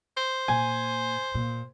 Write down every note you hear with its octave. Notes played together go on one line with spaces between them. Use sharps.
C5
A#2 G#5
A#2